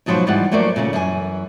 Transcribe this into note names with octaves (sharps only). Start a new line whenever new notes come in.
G#2 B2 F3 F#3 B4 C5
G#2 E3 G3 F4 G4 F#5
F3 F#3 A3 A#3 C5 D5
A#2 C#3 A3 C#4
F#2 E3 G#4 G#5